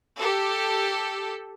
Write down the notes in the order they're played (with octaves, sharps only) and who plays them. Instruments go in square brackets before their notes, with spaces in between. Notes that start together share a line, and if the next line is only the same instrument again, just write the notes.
[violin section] G4 A4